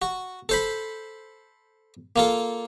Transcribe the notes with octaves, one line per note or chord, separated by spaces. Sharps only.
F#4
A4 C5 B5
A#3 F4 A4